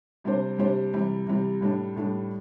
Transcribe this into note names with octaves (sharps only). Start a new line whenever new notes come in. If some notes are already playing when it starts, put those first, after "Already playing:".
C3 G3 D4 G4 C5
C3 G3 D4 G4 C5
C3 E3 G3
C3 E3 G3
A2 G3 D4
A2 G3 D4